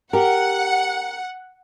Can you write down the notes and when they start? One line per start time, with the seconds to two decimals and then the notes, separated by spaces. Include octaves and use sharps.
0.13 G4 A#4 F#5